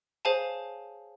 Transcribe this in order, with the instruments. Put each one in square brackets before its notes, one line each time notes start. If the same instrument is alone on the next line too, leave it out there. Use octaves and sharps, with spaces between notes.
[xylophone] G#4 C5 C#5 F5 G#5 A5